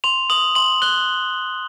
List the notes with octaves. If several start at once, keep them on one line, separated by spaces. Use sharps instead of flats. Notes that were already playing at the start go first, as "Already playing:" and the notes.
C6 F7
D#6 F#7
C6 F#7
F#6 G7